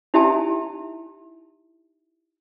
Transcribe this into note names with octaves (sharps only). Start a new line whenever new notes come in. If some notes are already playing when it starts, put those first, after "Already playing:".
D#4 E4 G4 E5 G#5 A5